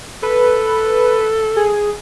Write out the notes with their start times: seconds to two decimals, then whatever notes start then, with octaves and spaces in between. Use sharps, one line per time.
0.23 A4 B4
1.56 G#4